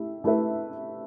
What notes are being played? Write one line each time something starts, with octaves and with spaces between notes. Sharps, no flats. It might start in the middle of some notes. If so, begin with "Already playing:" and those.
Already playing: A3 E4 G4 E5
A3 E4 G4 B4 E5